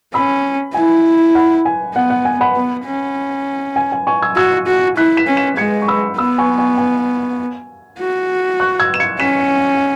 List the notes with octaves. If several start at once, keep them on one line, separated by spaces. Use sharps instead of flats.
C#4 B5 E6
E4 G#5
F#5 B5
G#5
B3 F#5
F#5
G#5
F#5 B5
B3
C#4
G#5
G#5
G#5 C#6
E6 G#6
F#4 E6 G#6
F#4
E4 F#6 B6
B6 E7
C#4
B6 E7
G#3 G#6 C#7
C#6
B5 E6
B3 B5 E6
G#5 C#6
G#5 C#6
G#5
F#4
C#6 F#6
E6 G#6
E7
G#6 C#7
C#4 B6 E7